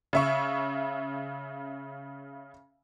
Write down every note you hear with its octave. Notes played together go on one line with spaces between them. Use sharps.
C#3 E5 C#6